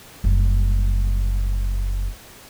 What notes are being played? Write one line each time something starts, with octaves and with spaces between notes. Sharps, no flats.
F#1 G3